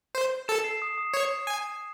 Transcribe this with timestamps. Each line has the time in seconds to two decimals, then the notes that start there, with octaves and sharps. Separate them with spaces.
0.15 C5
0.48 A4 E7
0.64 C7
0.82 D#6
0.98 D#6
1.14 C#5
1.47 G#5